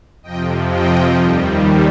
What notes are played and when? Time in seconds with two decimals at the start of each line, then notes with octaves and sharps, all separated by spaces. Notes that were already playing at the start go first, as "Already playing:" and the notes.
0.23 F2 C3 F3 D#5 G5
0.70 D#5 G5
1.17 D#2 D#3 G3